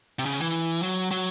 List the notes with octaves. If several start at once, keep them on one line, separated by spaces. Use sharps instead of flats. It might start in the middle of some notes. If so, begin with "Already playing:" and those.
C3
C#3
E3
F#3
F#3